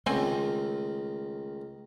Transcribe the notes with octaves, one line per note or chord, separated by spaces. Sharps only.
C#2 D#3 A3 C4 C#4 G#5